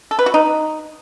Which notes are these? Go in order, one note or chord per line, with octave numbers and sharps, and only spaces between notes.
A4
B4
F#4
D#4